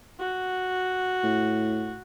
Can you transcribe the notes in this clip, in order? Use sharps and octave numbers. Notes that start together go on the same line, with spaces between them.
F#4
A2